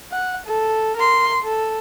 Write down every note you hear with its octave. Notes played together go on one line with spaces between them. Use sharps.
F#5
A4
A#4 C6
A4